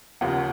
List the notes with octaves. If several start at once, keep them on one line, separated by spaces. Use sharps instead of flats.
D#2 C#3 F3 A#3 F#5